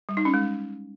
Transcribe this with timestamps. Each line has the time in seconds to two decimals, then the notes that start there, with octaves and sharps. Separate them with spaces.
0.09 G3
0.17 D#4
0.25 C#4
0.34 G#3